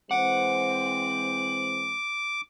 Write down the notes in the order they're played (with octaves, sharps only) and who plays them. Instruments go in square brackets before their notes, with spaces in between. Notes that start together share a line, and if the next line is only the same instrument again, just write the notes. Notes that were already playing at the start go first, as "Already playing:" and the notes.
[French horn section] E3 G#3 C4 [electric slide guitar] F#5 [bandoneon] D6